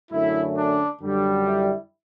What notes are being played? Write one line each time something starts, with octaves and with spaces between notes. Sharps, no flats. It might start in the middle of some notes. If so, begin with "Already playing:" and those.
F#2 D3 A3 C#4 E4
D4
F#2 D3 G3
E4